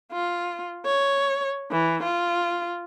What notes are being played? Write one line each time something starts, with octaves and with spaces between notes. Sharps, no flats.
F4
C#5
E3
F4